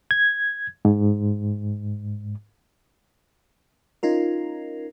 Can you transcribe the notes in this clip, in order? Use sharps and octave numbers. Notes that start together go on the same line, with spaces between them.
G#6
G#2
C#4 D#4 F4 A#4